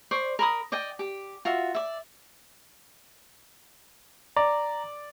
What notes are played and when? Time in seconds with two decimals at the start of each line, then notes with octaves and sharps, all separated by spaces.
0.11 C5 D5 C#6
0.39 A#4 B5 D#6
0.72 D5 D#5 G5
0.99 G4
1.45 F4 F#4 E5
1.75 D5 E5
4.36 D5 A#5